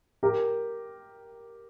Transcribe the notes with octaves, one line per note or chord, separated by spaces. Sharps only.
G4 A#4